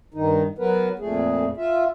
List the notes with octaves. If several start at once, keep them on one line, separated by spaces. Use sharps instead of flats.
G2 D#3 D#4
F#3 B3 A#4 B4
F2 A#2 A3 G#4
F4 E5